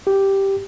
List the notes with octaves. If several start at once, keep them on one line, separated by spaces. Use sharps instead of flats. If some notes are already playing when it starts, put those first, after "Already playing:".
G4